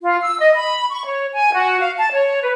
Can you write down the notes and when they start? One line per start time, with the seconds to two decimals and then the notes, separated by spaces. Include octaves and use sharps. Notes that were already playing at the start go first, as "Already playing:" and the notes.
0.02 F4
0.22 E6
0.39 D#5
0.56 B5
0.91 C#6
1.06 C#5
1.34 G#5
1.53 F#4
1.80 F5
1.97 A5
2.13 C#5
2.42 B4